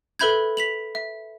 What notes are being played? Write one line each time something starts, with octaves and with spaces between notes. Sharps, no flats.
A4 B4 E5 B5 G6 G#6
B6 F7 F#7
E5